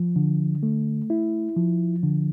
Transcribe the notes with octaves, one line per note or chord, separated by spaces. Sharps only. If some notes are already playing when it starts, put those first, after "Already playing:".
Already playing: F3
D3
A3
E4
F3
D3